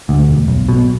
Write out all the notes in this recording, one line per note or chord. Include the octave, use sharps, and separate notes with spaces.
D2
E1
B1
B2